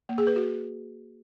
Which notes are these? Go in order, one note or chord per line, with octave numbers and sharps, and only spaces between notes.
A#3
G#4
B4
F#4